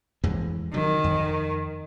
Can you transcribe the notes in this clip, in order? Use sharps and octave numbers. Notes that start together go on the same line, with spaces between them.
F2 E3 G#3
C3 D#3 F#3
F2